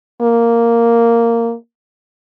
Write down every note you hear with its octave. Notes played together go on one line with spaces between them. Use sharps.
A#3